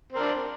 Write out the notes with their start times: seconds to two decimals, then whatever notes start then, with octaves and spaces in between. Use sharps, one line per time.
0.12 C4
0.16 A#4
0.19 D4